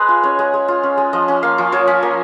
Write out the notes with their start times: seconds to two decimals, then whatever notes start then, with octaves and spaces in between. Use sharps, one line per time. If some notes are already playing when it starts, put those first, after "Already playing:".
Already playing: G#3 G#4 B4
0.09 F4
0.23 C#4 C#5
0.39 G#3
0.54 G#3
0.68 F4
0.83 C#4
0.98 G#3
1.13 F3 D#5
1.28 C#4
1.43 A#3 F5
1.58 F3
1.72 F3 C#5
1.87 C#4
2.03 A#3